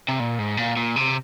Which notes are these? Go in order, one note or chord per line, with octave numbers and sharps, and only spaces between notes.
C3
A#2
G#2
A#2
A#2
C3